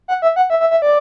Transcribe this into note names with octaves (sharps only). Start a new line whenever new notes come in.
F#5
E5
F#5
E5
E5
E5
D5